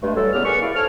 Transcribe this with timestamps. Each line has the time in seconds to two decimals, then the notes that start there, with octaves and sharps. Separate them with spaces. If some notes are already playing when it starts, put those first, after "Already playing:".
0.02 G2 G#3 A3
0.15 E3 F#3 G3 A4
0.33 A2 C#3 B3 G4 D5 F6
0.45 F#2 G#4 A#4 B4 D5 C#6
0.61 E4 D5 F5
0.75 G#2 A4 C#5 F6